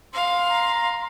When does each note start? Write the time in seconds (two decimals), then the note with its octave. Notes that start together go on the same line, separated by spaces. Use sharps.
0.14 F5 C6
0.48 A#5